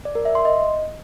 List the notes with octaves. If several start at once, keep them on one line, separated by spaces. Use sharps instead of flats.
D5
A#4
E5
C6
D#5